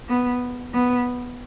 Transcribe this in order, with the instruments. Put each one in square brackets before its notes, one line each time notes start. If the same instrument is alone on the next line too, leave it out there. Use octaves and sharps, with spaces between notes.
[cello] B3
B3